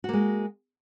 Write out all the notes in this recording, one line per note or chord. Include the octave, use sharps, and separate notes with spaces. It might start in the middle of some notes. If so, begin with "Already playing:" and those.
G#3 A#3 F#4